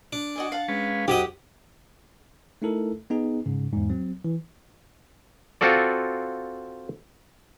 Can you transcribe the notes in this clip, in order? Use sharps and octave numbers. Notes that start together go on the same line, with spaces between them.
D4 D5
F#4 D#5 G#5
F5 F#5 A5
G#3 C#4 B4
F2 F#3 F#4 G4 D#5 F#5
A3 D#4 E4 A4 A#4
B3 D#4 G#4
G#2 C#3
E2 G#2
F#3 C4
E3
C4 F4 F#4 A4 D5